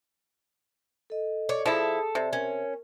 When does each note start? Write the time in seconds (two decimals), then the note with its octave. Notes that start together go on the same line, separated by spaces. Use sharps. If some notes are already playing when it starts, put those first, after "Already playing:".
1.10 A4 D#5
1.49 C#5 D5
1.66 F3 E4 G#4 A4 D#6
2.15 C3 D5
2.33 C#4 A#4